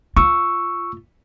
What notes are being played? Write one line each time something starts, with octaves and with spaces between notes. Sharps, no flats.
F4 C#6 E6